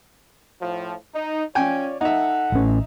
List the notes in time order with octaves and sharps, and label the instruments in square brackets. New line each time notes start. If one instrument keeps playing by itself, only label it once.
[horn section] A2 F3
D#4
[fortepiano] C#4 G5 G#5 [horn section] F4 C#5 D5
[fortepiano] D#4 E5 [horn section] A4 F#5
[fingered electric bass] A1 C#4